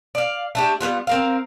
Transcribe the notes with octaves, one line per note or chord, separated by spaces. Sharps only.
D5 F5
A3 D4 G4
G3 G#3 B3 F4
C4 A#4 F5